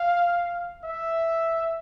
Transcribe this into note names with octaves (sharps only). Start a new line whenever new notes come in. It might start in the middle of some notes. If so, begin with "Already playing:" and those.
Already playing: F5
E5